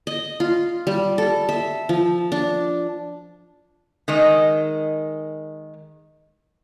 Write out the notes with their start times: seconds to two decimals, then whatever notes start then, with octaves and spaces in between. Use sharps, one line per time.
0.07 D#5
0.40 F4
0.87 G3
1.18 A4
1.49 E5
1.89 F3
2.32 D4
4.08 D#3 G#3 D#5